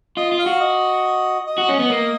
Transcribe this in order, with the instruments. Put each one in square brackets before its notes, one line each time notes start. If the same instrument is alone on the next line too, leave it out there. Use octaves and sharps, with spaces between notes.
[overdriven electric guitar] F4 [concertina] D#5
[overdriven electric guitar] F4
[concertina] F5
[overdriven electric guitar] F#4
[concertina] D#5
D#5
[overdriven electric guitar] F#4
C#4
B3
A#3